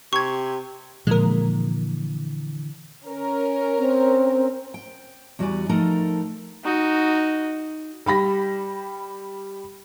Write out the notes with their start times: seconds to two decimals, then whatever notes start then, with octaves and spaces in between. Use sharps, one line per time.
0.13 C3 C#6 G#6
1.07 A#2 D3 E3 F3 G#3 A#3 A#4
3.05 C#4 A#4
3.78 C4
4.74 G5
5.39 E2 G3 F#4 C#5 D5 G#5
5.69 F3 A3 D#4 A4 A#4
6.64 D#4 F#4
8.06 G3 G4 B5 A#6